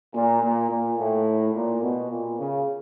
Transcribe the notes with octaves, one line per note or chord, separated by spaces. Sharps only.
A#2
A#2
A#2
A2
A#2
B2
A#2
C#3